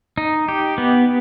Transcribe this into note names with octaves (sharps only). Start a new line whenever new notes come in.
D#4
G4
B3